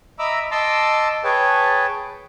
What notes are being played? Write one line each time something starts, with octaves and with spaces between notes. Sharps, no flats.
D#5 E5 A#5 B5 D6 E6
D#5 A5 C6 D6 E6
G#4 B4 C#5 G5 A5